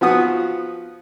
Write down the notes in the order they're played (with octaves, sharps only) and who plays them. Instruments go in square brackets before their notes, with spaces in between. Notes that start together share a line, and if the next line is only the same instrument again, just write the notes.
[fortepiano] F3 B3 F#4 D#6